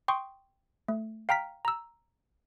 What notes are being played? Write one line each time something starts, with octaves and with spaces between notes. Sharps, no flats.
G5 C6 C#6 D#6
A3
F5 G5 A#5 F6 B6
A#5 E6